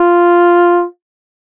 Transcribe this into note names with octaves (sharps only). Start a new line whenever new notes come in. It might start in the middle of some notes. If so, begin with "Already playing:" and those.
Already playing: F4